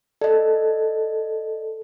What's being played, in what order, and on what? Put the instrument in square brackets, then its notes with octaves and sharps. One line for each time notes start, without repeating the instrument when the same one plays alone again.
[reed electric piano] A4 [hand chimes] D5 D#5